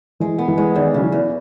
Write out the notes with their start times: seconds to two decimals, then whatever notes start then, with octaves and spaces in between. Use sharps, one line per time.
0.20 E3 G#3
0.38 B3
0.48 E3
0.57 G#3
0.75 E2 D#3
0.94 C#3 F#3
1.03 E3
1.12 E2